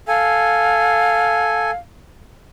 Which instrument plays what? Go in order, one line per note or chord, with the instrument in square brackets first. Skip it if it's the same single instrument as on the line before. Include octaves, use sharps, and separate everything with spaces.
[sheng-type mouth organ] A4 G#5 [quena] F5